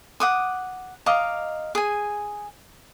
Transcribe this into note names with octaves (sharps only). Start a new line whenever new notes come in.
F#5 D6 D#6
D#5 F5 A#5 D6
G#4 G#5